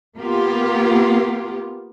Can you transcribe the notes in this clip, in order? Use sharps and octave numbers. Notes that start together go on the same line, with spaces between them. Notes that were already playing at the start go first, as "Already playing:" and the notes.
A#3 B3 F4 G4